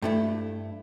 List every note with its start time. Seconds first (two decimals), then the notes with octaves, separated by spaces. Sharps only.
0.02 G2 A3 E4